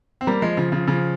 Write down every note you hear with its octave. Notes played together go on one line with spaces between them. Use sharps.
C4
G3 A#3
F3 G#3
C#3 F3
C#3 F3
C#3 F3